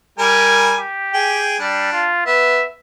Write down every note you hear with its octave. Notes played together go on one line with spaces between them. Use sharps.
G3 A#4 G#5
G4
G#4 G5
G3 D4
F4
B3 E5